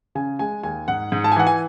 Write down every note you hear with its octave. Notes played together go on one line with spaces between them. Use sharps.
C#3 G#5
G#3 G#5
D#2 G#5
G#2 F#5
G#2
A5
G#5
E3 F#5
G#5